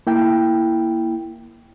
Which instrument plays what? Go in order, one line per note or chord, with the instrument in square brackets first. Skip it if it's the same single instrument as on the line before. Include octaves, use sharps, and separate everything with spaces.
[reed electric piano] A#3 E4 G5